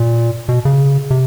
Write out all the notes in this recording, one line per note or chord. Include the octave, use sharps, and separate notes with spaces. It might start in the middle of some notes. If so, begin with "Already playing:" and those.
Already playing: A#2
B2
C#3
C3